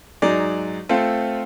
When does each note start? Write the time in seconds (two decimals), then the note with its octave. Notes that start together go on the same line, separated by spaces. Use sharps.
0.22 G#2 F#3 D#4 G#4 D5
0.89 A3 C4 F4 A4